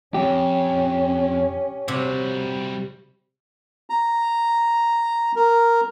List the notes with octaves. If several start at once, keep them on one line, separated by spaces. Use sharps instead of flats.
F2 C#4 G4
C3 G3 F#4
A#5
A#4